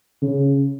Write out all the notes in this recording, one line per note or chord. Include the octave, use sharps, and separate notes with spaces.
C#3